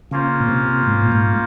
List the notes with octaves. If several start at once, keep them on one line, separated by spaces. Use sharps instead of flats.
C#3 A#3 C#4 F4 C5
A#2
C3
G#2
A#2
G#2